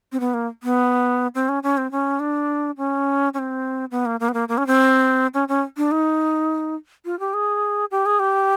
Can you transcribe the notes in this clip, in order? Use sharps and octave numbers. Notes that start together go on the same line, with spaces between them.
C4
B3
A#3
B3
C4
C#4
C#4
C4
C#4
D4
C#4
C#4
C4
B3
A#3
A#3
B3
A#3
A#3
C#4
C4
C#4
C#4
D4
D#4
F4
G4
G#4
G4
G#4
G4